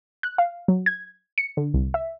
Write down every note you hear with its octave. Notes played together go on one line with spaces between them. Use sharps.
F#6
F5
F#3
G#6
C#7
D3
C2
E5